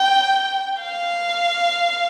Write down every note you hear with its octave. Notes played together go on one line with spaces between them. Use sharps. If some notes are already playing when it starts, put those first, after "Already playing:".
Already playing: G5
F5